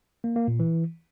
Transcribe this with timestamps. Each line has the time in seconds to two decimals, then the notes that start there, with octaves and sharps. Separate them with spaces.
0.24 A#3
0.36 A#3
0.48 A#2
0.59 E3